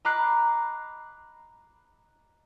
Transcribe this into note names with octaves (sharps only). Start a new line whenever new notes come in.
D#5 A#5 B5 D6 F#6 C7